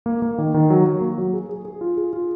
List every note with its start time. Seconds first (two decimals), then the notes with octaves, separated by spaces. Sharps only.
0.06 A#3
0.22 A#3
0.38 D#3
0.54 D#3
0.70 F#3
0.86 F#3
1.01 A#3
1.18 F#3
1.33 G#4
1.49 G#4
1.65 G#4
1.81 F4
1.97 G#4
2.13 F4